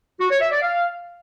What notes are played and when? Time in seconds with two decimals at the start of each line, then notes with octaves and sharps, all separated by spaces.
0.20 F#4
0.31 C#5
0.41 E5
0.51 D5
0.62 F5